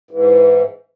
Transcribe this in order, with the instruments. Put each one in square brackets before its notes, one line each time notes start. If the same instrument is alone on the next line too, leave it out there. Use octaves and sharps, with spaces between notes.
[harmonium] G#2 E3